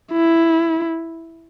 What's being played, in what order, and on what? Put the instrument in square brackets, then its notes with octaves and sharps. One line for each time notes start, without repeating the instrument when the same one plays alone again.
[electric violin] E4